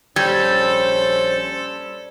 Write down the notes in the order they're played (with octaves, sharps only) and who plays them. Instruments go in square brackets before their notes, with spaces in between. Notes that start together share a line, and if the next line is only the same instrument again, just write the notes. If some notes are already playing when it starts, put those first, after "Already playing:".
[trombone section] A#1 C#4 C5 [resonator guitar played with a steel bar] G3 [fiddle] A4 [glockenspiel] G#6